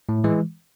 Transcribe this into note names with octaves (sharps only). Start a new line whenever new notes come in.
A2
E3 G#3